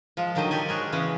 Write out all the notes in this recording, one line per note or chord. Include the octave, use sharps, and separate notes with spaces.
F3 G#3 F4
D3 D#3 F#3 C5 D#5
G4 A4 D5 D#5 G#5
G#3 F#4 G#4 A#4
C#3 E3 B3 C#4